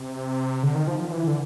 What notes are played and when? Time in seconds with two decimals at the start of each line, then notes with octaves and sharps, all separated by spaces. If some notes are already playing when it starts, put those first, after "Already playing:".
Already playing: C3
0.63 D3
0.75 D#3
0.87 F3
1.00 F3
1.12 E3
1.27 D3